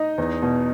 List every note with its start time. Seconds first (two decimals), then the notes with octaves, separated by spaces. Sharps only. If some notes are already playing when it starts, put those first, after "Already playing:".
Already playing: D#4 D#5
0.18 E2
0.42 B2